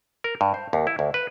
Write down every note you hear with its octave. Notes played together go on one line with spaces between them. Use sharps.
A#4
G2
C5
D#2
E4
D2
B4